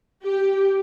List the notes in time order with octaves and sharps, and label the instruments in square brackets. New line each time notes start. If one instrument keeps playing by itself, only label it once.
[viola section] G4